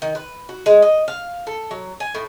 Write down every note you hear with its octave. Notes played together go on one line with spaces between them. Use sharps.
D#3
B4
F#4
G#3
D#5
F5
A4
F#3
G#5
A2